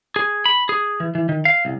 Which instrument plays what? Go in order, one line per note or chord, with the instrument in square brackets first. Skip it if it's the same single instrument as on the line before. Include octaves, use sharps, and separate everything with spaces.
[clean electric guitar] G#4
B5
G#4
E3
E3
D#3
F5
C2